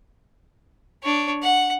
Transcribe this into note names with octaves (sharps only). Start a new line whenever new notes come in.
D4 C#5
F#5